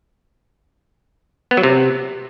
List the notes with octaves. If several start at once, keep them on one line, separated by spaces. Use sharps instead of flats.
B3
F#3
C3